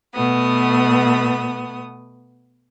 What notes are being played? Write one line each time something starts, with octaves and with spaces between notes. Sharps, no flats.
B2 A3 B3 D#6